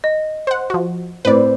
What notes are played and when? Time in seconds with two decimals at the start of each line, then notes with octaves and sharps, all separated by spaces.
0.04 D#5
0.47 C5 F#5
0.70 F3 F#4
1.25 A2 C4 B4 C5 D5